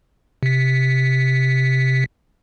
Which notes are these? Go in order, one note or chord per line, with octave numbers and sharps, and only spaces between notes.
C3 B6